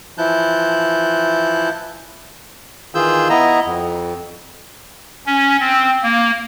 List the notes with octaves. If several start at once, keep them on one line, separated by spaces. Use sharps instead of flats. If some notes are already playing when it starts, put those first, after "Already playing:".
E3 F3 E4 A5 F#6 G6
D#3 E3 F4 G#4 E6 G6
B3 E4 D#5 A#5
F2
C#4
C4
A#3